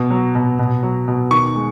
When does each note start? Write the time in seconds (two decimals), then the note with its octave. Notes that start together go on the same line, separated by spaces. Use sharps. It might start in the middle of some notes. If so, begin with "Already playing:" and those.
Already playing: B2
0.10 F#3
0.35 B2
0.59 B2
0.83 F#3
1.08 B2
1.31 D#3 C#6
1.56 G#3